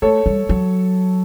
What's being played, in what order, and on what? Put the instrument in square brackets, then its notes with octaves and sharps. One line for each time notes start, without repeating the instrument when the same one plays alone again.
[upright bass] A3 [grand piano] A4 C#5
[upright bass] G3
F#3